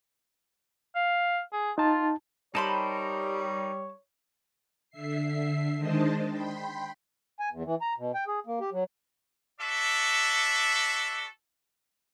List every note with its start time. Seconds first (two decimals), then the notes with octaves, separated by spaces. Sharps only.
0.95 F5
1.52 G#4
1.78 D#4 F4 A5
2.55 G3 D#4 A#4 C5 C#5 A5 B5 C6
4.90 D3 E5 C7
5.77 D#3 G#3 D4 C5 D#5 A5
6.29 G5 B5 C6
7.40 G#5
7.51 E2
7.65 E3
7.82 A#5
7.98 B2
8.15 G5
8.27 G#4
8.46 A#3
8.60 G4
8.72 F#3
9.60 F#4 A4 D5 E5